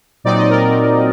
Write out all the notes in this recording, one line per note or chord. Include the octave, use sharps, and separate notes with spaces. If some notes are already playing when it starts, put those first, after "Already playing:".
A#2 F#3 C4 D#4 D5
D#5
A#4 D5